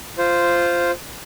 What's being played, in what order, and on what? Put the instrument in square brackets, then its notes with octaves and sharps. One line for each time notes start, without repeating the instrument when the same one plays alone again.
[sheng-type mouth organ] F4 C5